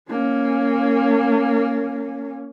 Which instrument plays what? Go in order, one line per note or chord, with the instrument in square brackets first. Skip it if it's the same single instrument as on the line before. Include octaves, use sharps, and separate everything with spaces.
[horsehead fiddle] A#3 C#4